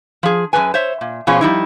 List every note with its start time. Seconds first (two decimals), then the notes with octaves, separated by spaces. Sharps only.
0.23 F3 G#4
0.53 F#2 F#3 G#4 B4 G#5
0.74 C5 C#5 E5
1.01 A#2
1.27 B2 F3 C#4 F4 G#4
1.41 F3 G3 D#4 E4